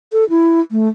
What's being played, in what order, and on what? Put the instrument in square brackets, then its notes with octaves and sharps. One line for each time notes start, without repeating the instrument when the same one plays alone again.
[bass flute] A4
E4
A3